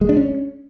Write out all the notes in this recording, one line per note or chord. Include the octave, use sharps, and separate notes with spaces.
G#3
D4
C#4